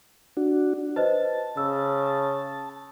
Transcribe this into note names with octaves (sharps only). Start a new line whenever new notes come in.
D4 F#4
B4 C5 D#5 A5
C#3 E6